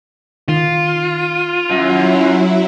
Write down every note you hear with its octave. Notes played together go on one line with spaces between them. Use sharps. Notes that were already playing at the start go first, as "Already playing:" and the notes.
D#3 F4
F#2 F#3 E4